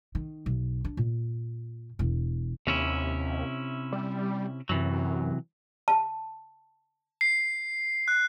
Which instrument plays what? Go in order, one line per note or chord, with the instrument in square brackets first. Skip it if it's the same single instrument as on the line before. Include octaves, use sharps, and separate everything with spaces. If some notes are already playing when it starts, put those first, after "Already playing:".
[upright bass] D#3
B1
D4
A#2
E1
[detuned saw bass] D#2 [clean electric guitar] C3 C#4 E4
[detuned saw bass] G3
[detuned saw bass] F#2 [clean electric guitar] C3 E3 F#3
[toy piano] A5
[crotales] C7
F#6